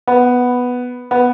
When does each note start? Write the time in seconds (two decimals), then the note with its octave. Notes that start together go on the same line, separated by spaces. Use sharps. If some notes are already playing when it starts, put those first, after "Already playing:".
0.07 B3
1.11 B3